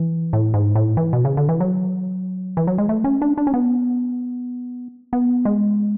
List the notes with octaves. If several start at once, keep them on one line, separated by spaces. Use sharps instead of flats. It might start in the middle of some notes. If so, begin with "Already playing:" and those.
Already playing: E3
A2
G#2
A2
E3
B2
C#3
D3
E3
F#3
E3
F#3
G#3
A3
C#4
D4
D4
C#4
B3
B3
G#3